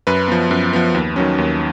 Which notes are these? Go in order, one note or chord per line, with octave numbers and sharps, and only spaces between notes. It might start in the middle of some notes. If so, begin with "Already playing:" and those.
F#2 B4
F3 B3
F#2
F3 B3
D#2
D#3 F#3 C#4
D#2